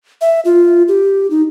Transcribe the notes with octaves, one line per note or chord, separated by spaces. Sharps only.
E5
F4
G4
D#4